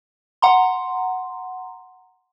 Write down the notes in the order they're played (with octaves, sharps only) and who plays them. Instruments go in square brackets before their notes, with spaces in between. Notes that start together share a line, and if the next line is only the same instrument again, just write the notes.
[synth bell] F#5 A#5 C6